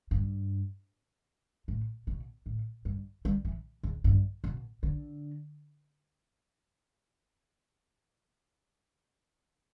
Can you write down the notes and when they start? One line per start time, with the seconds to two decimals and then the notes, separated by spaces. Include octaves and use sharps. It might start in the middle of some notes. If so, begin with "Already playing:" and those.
0.11 G2
1.68 A2
2.07 B2
2.46 A2
2.85 G2
3.25 G3
3.45 E3
3.83 E2
4.04 G2
4.44 B2
4.83 D3